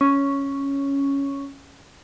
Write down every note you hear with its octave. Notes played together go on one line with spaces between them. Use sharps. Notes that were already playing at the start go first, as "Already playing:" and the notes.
C#4